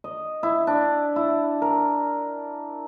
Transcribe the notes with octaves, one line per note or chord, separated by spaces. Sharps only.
D#5
E4
D4
E4
A#4